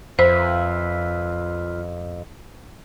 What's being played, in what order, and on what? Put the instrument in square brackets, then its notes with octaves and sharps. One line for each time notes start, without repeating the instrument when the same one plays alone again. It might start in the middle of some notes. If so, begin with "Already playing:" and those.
[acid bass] F2 [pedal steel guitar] F4 B4 E5 [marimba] C5